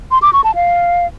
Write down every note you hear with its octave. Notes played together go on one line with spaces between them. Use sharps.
C6
D6
C#6
A5
F5